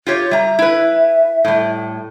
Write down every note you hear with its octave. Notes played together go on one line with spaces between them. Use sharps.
F4 G4 C#5
G3 E5 A#5
E4 B4
A2 G3